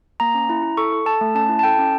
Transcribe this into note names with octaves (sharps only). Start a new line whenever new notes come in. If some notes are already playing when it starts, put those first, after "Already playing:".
A#3 A#5
C#4
E4
E4
A4 C#6
A4
A4 A5
A3
C#4 A5
E4
A5
A4 G5
C#4